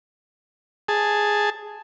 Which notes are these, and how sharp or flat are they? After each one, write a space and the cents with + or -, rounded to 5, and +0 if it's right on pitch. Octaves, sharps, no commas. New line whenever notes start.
G#4 +0 A5 +0